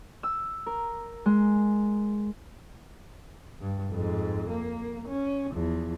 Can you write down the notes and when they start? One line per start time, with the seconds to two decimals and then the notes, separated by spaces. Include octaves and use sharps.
0.23 E6
0.66 A#4
1.26 G#3
3.60 G2
3.91 F2 G#2
4.48 A#3
5.08 C#4
5.54 E2 F3